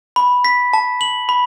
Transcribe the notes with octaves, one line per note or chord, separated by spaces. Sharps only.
B5
B6
A5
F#7
B5